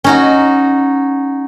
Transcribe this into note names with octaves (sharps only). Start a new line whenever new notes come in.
C#4 D#4 F#4